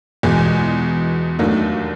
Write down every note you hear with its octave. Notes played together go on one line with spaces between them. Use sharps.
E2 B2 G#3
D#2 D#3 F#3 A3 D4